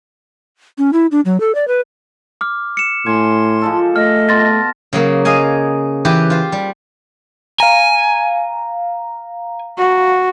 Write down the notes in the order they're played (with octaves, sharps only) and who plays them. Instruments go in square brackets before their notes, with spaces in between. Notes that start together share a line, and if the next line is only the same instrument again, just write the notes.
[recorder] C#4
E4
D4
F#3
A4
D5
B4
[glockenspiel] D6 F6
C#7 E7
[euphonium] A2 [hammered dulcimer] G#5 [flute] C6
[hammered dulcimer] F3 G#3 A4
[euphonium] A3 [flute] D#5 [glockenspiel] F6
[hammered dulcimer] B2 A5 [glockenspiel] C6 A6 A#6
[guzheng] C#3 F#3 A#3
G#4 D#5 F5 G#5
E3 G4 B4
F4 C5
G3
[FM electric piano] F5 A#5 [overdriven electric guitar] G#5
[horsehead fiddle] F#4